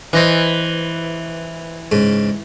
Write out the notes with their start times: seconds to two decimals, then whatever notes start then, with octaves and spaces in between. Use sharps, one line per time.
0.13 E3 C5 D#5 E5
1.92 G#2 C#3